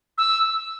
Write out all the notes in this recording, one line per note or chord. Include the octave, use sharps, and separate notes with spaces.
E6